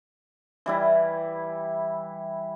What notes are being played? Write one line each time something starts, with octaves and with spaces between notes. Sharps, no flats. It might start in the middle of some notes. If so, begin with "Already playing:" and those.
E3 G3 E4